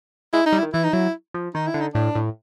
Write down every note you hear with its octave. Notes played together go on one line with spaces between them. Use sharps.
G#3 E4
D#4
G3
E4
D#3
E3 E4
D#4
F#3 E4
F3
D#3 D#4
E4
D3
D#4
A2 D4
A2